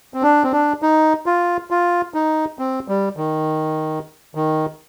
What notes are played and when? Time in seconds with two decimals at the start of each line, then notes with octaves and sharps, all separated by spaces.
0.14 C4
0.22 D4
0.44 C4
0.52 D4
0.82 D#4
1.26 F4
1.71 F4
2.14 D#4
2.59 C4
2.88 G3
3.17 D#3
4.35 D#3